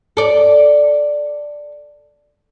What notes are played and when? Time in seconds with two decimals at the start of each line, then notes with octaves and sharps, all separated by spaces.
0.17 A4 D5